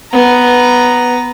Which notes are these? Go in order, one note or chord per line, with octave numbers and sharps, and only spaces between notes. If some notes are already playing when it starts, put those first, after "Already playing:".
B3 A#5